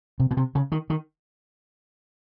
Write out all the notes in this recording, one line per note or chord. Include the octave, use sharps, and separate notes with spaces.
C3
B2
C3
C#3
D#3
D#3